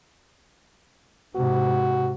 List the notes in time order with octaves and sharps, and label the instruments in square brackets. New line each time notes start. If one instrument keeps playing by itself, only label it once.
[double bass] G#2 C3 [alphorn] F#4